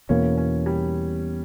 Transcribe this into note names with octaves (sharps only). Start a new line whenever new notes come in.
E2 B2 A#3 C#4
C#4
G3